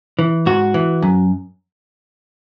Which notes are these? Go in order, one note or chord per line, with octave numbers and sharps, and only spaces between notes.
E3
G#2 F#4
E3
F#2